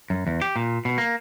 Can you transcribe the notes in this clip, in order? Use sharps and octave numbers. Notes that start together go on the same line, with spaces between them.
F#2
E2
G4
A#2
B2
A#3